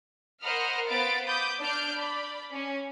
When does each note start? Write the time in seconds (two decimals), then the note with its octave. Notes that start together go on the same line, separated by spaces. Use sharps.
0.43 A#4 C5 D#5 F#5 B5 F6
0.88 B3 C5 F5 B5 A6 D7
1.26 B5 D6 D#6 G6
1.60 D4 D5 F6 G6 D7
1.95 D5 B5
2.53 C#4